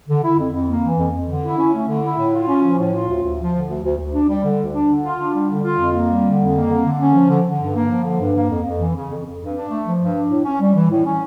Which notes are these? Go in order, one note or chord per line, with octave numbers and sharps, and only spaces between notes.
D3
E4
F2
F2
A#3
E3
F2
F2
D3
E4
C#4
A3
D3
E4
A2
F4
C#4
F3
A2
F4
D2
D2
F3
D3
D2
D2
D2
D4
G3
D3
D2
D4
D3
F4
D4
G3
D3
F4
F2
A#3
G3
D3
F2
A#3
D3
D3
C#4
F3
D3
D3
G2
A#3
F3
D3
G2
A#3
F2
F2
E3
C#3
F2
F2
G2
D4
A3
F3
G2
D4
A2
C#4
G3
E3
A2
C#4